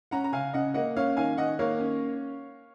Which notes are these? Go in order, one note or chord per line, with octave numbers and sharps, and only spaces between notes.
C#4 F#5 A#5
A#5
C#3 F5 G#5
C#3 D#5 F#5
A#3 D#5 F#5
C#4 C#5 F5
D#3 F5 G#5
D#3 D#5 F#5
A#3 C#5 F5
C#4